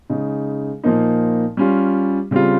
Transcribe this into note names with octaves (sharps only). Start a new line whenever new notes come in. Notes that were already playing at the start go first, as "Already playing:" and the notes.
C#3 G#3 D#4
A#2 F3 A#3 D#4
G3 C#4 F4
C#3 G3 C4 F4